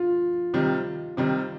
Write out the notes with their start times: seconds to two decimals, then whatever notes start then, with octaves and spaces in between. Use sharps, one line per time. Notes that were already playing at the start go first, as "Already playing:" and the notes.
Already playing: F4
0.54 C3 D#3 G3
1.17 C3 D#3 G3